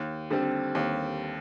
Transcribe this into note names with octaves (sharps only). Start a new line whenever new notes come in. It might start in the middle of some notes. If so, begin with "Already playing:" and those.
Already playing: D#2
D3 G3 C4
D#2